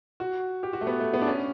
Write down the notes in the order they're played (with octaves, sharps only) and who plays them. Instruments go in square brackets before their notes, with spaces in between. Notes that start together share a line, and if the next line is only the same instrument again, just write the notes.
[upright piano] F#4
G4
F#4
A3
B3
A3
B3
D4
C#4